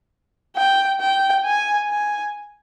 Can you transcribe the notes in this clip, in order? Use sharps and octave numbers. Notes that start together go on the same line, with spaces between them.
G5
G5
G#5
G#5